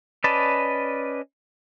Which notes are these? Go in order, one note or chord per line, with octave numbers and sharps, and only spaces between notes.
C#4 B4 D5 D#5 A5